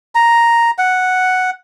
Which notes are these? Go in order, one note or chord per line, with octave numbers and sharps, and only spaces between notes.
A#5
F#5